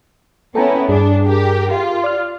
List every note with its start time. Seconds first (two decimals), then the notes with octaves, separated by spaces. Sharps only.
0.55 B3 C#4 E4 A4 G5 A#5
0.89 G2 D4 G#4
1.26 G4 A#4
1.71 F4 G4
2.04 D5 F6